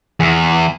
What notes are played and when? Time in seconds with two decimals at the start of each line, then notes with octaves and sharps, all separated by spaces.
0.20 E2